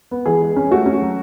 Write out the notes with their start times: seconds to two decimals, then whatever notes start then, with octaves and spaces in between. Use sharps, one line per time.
0.11 B3
0.26 E3 G#4
0.42 G#3
0.56 C#4
0.71 A3 F#4
0.86 C#4
1.01 F#3